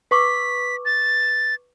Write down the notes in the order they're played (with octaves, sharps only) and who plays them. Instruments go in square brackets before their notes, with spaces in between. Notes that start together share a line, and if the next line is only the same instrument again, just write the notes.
[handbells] B4 C#6 D6 [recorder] B6
[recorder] A6